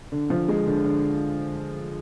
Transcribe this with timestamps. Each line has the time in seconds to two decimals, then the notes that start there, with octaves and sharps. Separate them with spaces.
0.12 D3
0.30 F3
0.48 G#3
0.67 D3
0.84 D3